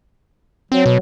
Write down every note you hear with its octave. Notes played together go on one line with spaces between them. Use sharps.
F#3 C4
B2